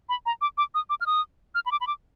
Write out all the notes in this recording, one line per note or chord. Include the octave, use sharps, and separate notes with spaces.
B5
A#5
D6
D6
D#6
D6
F6
D#6
F6
B5
D6
B5
D6